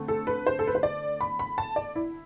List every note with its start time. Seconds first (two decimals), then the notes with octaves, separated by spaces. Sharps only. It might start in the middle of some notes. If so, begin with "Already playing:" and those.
Already playing: D3 A3 C4
0.08 A4
0.27 B4
0.47 C5
0.59 A4
0.67 B4
0.75 C5
0.83 D5
1.21 B5
1.39 B5
1.58 A5
1.76 D5
1.96 E4